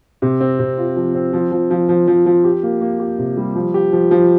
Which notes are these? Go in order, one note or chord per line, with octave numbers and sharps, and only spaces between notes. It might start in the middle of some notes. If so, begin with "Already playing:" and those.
C3
C4
C3
F4
F3
C4
F3
F3
F3
F3
F3
F3
G4
A#3
A#3
G4
C3
G3
F3
G4
F3
F3